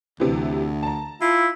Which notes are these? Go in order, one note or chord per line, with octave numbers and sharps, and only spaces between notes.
D2 C3 E3
A5 A#5
E4 F4